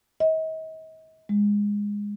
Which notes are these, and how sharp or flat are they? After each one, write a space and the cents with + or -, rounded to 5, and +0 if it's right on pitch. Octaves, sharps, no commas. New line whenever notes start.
D#5 +40
G#3 -15